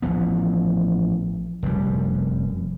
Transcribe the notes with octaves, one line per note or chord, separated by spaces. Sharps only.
A1 F3 B3
F1 F#2 G3